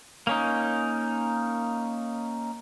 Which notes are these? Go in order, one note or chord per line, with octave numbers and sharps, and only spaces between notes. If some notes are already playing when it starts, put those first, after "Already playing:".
A#3 C#4 D#4